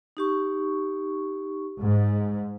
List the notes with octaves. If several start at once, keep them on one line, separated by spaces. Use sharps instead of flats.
D#4 G4 C#6
G#2